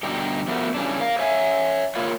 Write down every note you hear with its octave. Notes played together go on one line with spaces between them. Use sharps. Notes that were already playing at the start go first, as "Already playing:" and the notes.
G2 B2 D3 D#4 G4
F3 A3 B3 F#4 G4 A#4
C#3 E3 G3 C#4 D4
A#4 F5
C#5 E5 G#5
A#3 F4 A#4 B4 C#5 F5